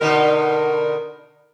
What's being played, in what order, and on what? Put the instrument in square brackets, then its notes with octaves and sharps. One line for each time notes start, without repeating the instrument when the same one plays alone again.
[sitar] B2 D3 D#4 [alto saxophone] A#4